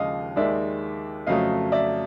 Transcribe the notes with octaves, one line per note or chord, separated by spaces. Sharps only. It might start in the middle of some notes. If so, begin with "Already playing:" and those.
Already playing: D#2 C#3 F3 G#3 D#5 F5
D#2 D#3 G#3 D5 E5
F2 C#3 F#3 A3 D#5 F5
D5 E5